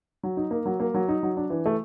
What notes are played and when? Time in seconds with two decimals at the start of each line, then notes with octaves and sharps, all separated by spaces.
0.23 F#3
0.37 D#4
0.51 A#3
0.66 F#3
0.80 A#3
0.94 F#3
1.08 D#4
1.23 F#3
1.37 D4
1.50 E3
1.66 A3